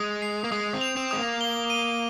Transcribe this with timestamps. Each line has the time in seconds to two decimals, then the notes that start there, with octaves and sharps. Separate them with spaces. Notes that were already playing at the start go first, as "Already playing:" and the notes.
Already playing: G#3 D#6
0.22 C7
0.44 A#3
0.52 G#3 D#6
0.73 C4
0.81 F7
0.97 C4
1.11 G#3 D#6
1.18 A#3
1.41 G7
1.70 D#7